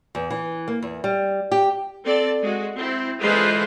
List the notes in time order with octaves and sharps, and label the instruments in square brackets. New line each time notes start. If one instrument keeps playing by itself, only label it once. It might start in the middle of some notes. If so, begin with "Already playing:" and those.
[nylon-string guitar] E2
E3
A#3
E2
G3
G4
[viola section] C4 A4 D5
G#3 F#4
C4 E4
D3 E3 G#3 F4 B4 C5